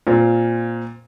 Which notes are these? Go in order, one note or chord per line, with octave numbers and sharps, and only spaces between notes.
A#2 C4 F4